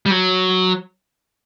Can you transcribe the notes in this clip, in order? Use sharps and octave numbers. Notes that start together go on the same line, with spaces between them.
G3
F#3